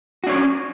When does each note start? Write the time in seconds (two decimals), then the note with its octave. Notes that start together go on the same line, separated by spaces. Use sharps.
0.24 F#4
0.27 D4
0.30 C#5
0.33 C#4